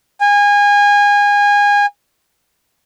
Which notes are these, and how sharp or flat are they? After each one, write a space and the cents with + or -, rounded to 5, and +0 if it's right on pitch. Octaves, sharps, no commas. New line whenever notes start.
G#5 -25